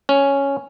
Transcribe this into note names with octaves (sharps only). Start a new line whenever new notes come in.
C#4